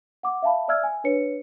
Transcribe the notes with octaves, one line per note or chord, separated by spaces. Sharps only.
F#5 D6
E5 F5 A5 B5
D5 E5 E6 F6 G#6
G#5
D4 B4 C#5 C#7